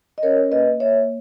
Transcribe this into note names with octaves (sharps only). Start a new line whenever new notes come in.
D#5
C#4 A#4 C#5
A#3 B4 D#5
A#3 C#5 E5